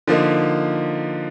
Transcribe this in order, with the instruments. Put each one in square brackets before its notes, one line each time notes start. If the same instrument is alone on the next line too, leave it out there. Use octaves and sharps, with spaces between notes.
[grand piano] D3 F3 A#3 D#4